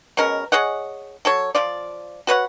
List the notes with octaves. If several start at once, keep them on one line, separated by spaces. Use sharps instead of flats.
B2 G#3 C#4 A#4
G#4 C#5 D#5 F#5
F#3 A4 C#5
F3 F4 D5
F#4 B4 C#5 F#5